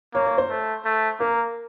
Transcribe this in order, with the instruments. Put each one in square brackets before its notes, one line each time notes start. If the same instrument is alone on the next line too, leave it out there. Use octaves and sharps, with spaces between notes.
[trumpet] A#3 [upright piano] C#5
[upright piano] C#5
C5
[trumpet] A3
A3
[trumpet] A#3 [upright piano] A#4